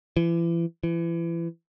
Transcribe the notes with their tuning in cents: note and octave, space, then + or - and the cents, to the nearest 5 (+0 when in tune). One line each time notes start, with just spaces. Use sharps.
E3 +35
E3 +30